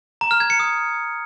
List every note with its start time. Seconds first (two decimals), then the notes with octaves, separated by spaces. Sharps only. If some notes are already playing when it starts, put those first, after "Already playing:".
0.21 A#5
0.31 F6
0.40 G#6
0.50 C#7
0.60 D#6